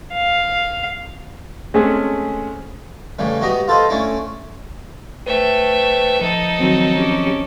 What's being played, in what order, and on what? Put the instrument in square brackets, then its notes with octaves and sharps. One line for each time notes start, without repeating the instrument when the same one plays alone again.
[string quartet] F5
[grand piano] G#3 A3 C4 C#4 G#4
[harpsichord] A2 C#3 E3 G3
B3 F#4 G4 D#5 A#5
F4 A4 B4 C5 D#5
A3 C#4 D4 E4
[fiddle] A3 E5 [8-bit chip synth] B4 C5 G5
[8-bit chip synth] F3 [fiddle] D#4 A4
[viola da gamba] D#3 F#3 C4
C#4 G4